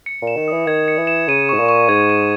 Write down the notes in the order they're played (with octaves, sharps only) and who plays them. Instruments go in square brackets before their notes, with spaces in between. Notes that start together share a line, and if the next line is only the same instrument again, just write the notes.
[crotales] C#7
[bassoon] A#2
[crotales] E7
[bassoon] D#3
[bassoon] E3 [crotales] D#6
[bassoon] D#3 [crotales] G#6
[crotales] C#7
[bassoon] E3
[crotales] E7
[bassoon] C#3 [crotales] D#7
[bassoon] G#2 [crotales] C#6
[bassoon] A#2
[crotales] C#6
[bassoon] G#2 [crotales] G#6
[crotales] D#7